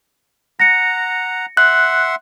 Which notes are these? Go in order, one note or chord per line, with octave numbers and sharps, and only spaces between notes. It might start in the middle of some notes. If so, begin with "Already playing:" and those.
F#5 A#5 A#6 C#7
E5 F#5 C6 F#6